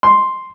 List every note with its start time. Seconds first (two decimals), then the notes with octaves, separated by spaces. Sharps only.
0.03 C6